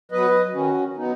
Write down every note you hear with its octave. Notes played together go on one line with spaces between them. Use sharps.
F#3 B3 B4 D#5
D#3 C#4 F#4
F#3 B3 D#4